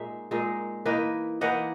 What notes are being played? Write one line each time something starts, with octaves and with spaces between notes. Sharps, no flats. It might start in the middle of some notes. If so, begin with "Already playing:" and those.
Already playing: A#2 G#3 D#4 E5
A#2 G#3 D#4
E3 A#3 D#4 B4 D#5
E3 A#3 D#4 D#5 F#5